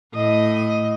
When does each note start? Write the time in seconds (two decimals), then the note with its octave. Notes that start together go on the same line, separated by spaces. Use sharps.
0.14 A2 D#5